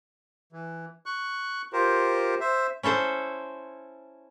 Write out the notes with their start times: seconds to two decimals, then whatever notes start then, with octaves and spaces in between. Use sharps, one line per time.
0.52 E3
1.06 C#6 F#6
1.73 F4 G4 A#4 C5
2.40 C5 E5
2.83 C#4 E4 A4 C5